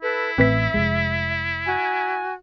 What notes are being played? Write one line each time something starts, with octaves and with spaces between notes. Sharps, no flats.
E4 A4 B4
A1 A2 C4 B4 E5 B6
F1 E2 G#3
F#4 G#5